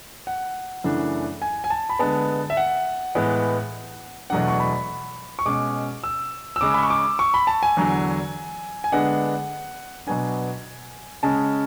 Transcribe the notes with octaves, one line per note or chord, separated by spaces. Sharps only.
F#5
F#2 C#3 E3 A3 D4
G#5
G#5
A5
B5
D3 G#3 B3 A5
E5
F#5
A2 E3 G#3 B3
E2 B2 F#3 A3 D4 F#5
C#6
B5
C#6
B2 G#3 C#4 D6
E6
E6
C#3 G#3 C#4 D6
B5
C#6
D6
C#6
B5
A5
G#5
E2 D3 F#3
G#5
D3 G#3 B3 D4 F#5
B2 F#3 B3 D4 G#5
C#3 G#3 C#4 A5